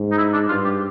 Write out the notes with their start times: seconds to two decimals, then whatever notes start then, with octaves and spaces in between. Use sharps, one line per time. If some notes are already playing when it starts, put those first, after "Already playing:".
Already playing: G#2
0.12 D#4
0.18 E4
0.33 D4
0.49 G2 F4
0.65 G4